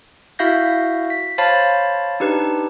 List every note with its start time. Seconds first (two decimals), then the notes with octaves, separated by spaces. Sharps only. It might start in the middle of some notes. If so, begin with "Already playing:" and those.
0.39 E4 F#4 E5 F5 G6 A#6
1.10 B6
1.38 C5 C#5 F5 A5 B5 A6
2.20 D4 D#4 G4 B4